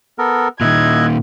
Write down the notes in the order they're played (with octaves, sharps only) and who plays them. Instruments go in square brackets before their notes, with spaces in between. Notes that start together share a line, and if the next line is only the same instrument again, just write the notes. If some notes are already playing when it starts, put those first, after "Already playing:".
[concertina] B3 A4 A#4
[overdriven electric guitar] A#2 D#3 [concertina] E4 D#5 F#6 [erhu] G#6